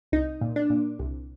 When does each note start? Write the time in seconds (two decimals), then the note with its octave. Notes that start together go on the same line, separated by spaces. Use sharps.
0.12 C2 D#4
0.41 A#2
0.56 D4
0.70 A#2
0.99 C2